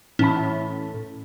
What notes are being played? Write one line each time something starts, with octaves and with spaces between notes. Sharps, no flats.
A2 E3 C#4 A5 B5